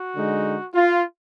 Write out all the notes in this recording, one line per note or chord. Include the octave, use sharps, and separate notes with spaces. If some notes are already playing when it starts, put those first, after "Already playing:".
Already playing: F#4
D3 G#3 D#4
F4